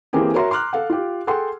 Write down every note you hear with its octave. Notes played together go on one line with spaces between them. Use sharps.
E3 A#3 C4 G4 G#4
F#4 A#4 C#5 E5 A#5 C6
A#5 C6 D6 F6 F#6
A4 F5 F#5
F4 G4
G#4 A4 F#5 G5 C6